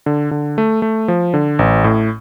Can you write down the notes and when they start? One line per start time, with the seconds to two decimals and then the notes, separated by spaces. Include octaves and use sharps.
0.06 D3
0.31 D3
0.58 A3
0.82 A3
1.08 F3
1.34 D3
1.59 A1
1.84 A2